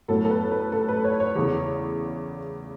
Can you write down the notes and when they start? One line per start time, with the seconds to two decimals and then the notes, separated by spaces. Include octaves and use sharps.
0.08 A2 F#3 B3 A4
0.25 A4
0.30 B4
0.51 B4
0.72 A4
0.88 B4
1.04 C#5
1.20 C#5
1.36 E2 C#3 E3